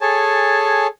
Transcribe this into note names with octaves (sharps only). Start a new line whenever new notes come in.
G#4 A4 C#5 G#5 A5